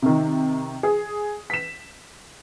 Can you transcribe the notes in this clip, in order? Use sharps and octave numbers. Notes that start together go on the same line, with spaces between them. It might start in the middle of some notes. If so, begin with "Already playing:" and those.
C3 D#3
G#4
B6 E7